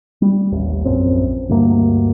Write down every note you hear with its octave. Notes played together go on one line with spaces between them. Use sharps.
G3
A1 D#2
A#1 F#2 C4
D2 G2 A#3